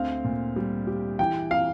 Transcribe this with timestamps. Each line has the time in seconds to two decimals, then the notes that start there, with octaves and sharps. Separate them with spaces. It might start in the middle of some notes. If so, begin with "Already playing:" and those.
Already playing: D2 C4 F5
0.24 A#2
0.56 G3
0.87 G4
1.19 E3 G5
1.51 F5